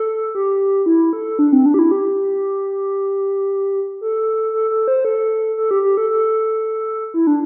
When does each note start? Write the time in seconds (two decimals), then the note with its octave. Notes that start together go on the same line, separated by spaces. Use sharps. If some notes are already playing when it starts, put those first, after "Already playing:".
Already playing: A4
0.35 G4
0.86 E4
1.13 A4
1.39 D4
1.52 C4
1.66 D4
1.74 G4
1.79 E4
1.91 G4
4.01 A4
4.54 A4
4.71 A4
4.88 C5
5.05 A4
5.57 A4
5.71 G4
5.83 G4
5.97 A4
6.10 A4
7.14 E4
7.27 D4